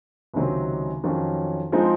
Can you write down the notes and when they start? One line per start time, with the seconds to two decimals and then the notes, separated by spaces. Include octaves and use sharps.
0.34 C#2 C3 D#3 F#3 C4
1.04 F2 D#3 F#3 C#4
1.72 F3 G#3 C4 D#4